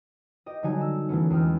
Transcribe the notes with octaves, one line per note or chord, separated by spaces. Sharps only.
G4 D#5
D3 F#3 G3 D#4 F#4 G#5
E6
E3 F#3 A3 B3 C#4
E2 G#3 G5 F6